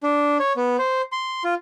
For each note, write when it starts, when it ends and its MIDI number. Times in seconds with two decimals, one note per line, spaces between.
0.03 0.38 62
0.40 0.53 73
0.56 0.77 59
0.79 1.02 72
1.12 1.43 84
1.44 1.54 65